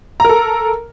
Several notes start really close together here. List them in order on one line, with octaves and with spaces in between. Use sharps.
A#5 A#4 A4